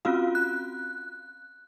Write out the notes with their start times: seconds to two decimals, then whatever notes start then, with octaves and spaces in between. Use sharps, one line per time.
0.05 C4 C#4 F4 F#4 F5
0.35 F#6